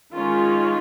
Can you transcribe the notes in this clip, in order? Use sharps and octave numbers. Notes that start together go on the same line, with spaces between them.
D#3 G#3 C#4 F4